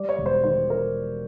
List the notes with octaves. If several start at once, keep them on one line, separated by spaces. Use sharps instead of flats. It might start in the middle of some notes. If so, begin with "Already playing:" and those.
Already playing: G3 D5
C#5
E1
C5
D#3 C5
A#4